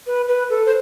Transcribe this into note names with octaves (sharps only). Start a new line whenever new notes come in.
B4
B4
A4
C5